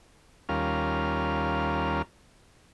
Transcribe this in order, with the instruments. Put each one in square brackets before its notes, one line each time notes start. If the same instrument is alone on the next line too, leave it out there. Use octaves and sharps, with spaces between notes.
[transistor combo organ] D#2 G3 C#4 F4 A#4 F6